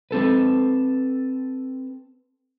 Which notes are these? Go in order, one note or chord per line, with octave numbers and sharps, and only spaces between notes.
C4 A4 B4